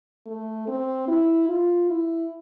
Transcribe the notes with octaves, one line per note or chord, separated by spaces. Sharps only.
A3
C4
E4
F4
E4